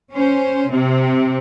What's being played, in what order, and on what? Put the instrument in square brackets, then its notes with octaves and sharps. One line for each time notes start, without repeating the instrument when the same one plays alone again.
[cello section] C#4 C5
C3 C4